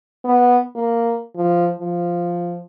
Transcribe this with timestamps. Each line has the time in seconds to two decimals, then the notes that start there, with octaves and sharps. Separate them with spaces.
0.25 B3
0.75 A#3
1.36 F3
1.80 F3